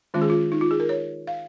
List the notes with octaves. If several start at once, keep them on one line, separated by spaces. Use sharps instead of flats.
D#3 G#3 C#4 F4
G#4
F4
D#4
F4
G#4
A#4
C#5
F5